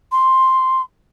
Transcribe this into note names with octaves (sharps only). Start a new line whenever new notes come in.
C6